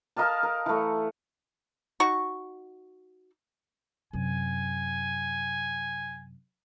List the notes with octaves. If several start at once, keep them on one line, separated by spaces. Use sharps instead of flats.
A#4 D#5 F5 A5
A#4
E3 A3
D#4 F#4 C#6
F#2 C3 G#5